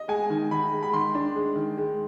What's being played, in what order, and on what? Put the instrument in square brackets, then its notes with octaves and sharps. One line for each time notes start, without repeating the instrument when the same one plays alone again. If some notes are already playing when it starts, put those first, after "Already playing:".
Already playing: [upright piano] D#5
[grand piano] G#3 [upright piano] G#5
[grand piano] D#3
[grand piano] D#3 [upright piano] B5
[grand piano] G#3
[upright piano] B5
[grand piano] D#3 [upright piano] C6
[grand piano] D4
G#3
D#3
G#3